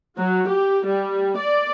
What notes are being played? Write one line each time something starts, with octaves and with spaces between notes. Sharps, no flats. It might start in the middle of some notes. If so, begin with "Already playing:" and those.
F#3
G4
G3
D5